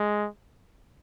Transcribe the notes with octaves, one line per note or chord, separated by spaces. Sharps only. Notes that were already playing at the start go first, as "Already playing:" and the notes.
Already playing: G#3